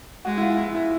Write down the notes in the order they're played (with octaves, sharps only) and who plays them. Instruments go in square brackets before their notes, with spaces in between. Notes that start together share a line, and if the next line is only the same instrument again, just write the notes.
[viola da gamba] G#3 [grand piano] F#4
[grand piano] E4
F4
E4
E4